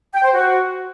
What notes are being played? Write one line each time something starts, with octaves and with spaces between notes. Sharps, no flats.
G5
C5
F#4